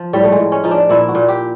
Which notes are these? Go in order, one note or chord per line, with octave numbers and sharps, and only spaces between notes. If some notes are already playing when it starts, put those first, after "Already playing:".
Already playing: F3
A2 G3
A3
G#3
A2
C#4
F3 D#4
D4
A#2 E4
F#4
A#2
G4